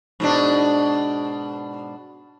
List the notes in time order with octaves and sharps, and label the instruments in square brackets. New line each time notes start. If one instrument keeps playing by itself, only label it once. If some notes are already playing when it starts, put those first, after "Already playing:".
[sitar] G#2 B2 D4